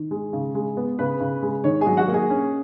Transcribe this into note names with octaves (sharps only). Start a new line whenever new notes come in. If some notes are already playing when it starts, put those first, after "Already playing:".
Already playing: D#3
G#3
C#3
G#3
B3
C#3 B4
C#3
G#3
D#3 C#5
G#4 G#5
F#3
F#4 F#5
A#3
G#4 G#5
C#4